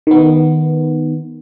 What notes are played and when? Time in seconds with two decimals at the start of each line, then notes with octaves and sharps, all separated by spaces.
0.07 D#3 B3